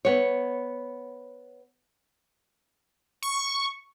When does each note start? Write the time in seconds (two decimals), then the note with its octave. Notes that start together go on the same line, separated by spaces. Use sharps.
0.05 B3 C#5
3.23 C#6